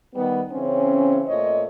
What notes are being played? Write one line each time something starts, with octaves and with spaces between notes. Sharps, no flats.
D#3 G3 B3
C#3 E3 C4 C#4
A#2 A3 C5 C#5 D#5